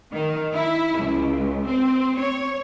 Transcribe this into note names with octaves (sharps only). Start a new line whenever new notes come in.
D#3
E4
C#2
C4
C#5